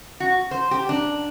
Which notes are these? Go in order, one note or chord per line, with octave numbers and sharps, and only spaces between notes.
F#4
C5
G4
D4